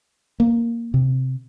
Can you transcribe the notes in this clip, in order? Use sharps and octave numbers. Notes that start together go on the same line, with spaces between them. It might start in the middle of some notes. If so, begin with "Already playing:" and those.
A#3
C3